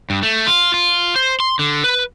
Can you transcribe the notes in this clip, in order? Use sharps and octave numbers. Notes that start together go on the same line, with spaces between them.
G2
A3
F4
F4
C5
C6
D3
B4